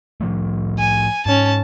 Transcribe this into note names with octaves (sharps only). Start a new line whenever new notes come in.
A2 F3 A3
G#5
G#2 C#4 A5